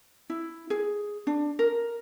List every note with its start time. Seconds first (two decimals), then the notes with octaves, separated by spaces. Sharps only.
0.30 E4
0.70 G#4
1.27 D4
1.59 A#4